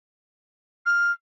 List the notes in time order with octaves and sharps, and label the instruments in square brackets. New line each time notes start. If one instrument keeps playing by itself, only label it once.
[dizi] F6